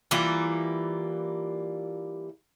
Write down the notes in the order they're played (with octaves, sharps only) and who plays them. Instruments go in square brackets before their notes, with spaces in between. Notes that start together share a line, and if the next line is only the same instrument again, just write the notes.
[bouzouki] E3 G3 A#3 F4